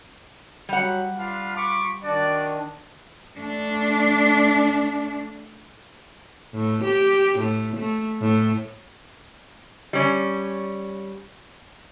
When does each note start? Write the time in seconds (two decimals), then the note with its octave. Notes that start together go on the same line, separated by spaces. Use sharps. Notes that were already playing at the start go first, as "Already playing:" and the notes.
0.69 F#3 G3 F#5
1.17 D4 F4 B4 F5
1.57 B5 C#6 D6
2.04 D#3 D4 F#4 D5
3.37 A3 D4
6.54 A2
6.84 G4
7.39 A2
7.77 A3
8.21 A2
9.93 G3 C#4